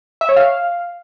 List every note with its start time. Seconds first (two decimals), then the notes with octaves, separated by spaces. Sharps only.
0.21 E5
0.29 C#5
0.37 F5